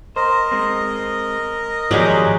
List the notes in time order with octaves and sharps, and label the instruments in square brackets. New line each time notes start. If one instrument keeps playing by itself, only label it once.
[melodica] A#4 D#5 [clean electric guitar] C5
[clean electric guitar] G#3 C4
[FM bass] G#2 [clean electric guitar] D#3 F3 D5 [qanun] F#3 G#3 G4